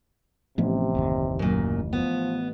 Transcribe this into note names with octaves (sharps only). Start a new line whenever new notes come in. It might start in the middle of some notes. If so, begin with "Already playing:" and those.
A1 C3 F3 B3 C#4
F#1 D#2 D#3
F#2 A#2
F3 B3